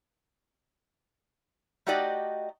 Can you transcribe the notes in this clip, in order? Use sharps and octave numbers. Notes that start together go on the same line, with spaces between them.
A3 D#4 F#4 G4 D5 D#5